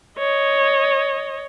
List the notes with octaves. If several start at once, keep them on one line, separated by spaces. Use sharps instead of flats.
C#5 D#5